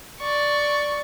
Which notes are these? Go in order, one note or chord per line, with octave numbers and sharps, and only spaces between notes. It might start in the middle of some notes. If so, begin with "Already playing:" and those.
D5 C#6